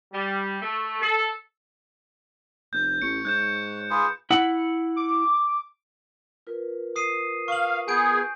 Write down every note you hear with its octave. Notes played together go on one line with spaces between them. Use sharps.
G3
A3
A4
F1 G6
A1 C#5 C#7
G#2 F#6 G6 E7
F4 G#4 B4
E4 F#5
D6
F4 A#4 B4
D#6 C7 D#7
F5 C#6 F#7
B3 G#4 G#5 G6 D7